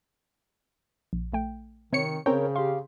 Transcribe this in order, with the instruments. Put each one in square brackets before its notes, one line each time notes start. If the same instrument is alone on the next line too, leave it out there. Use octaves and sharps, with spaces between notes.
[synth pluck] A#1
A#1 A3 G5
[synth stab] C3 C#5 C#7 [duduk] D#3
[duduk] C#3 [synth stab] C4 G5 [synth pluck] C#4 [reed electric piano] A#4 C#5
[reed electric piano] G4 F5 [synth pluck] C6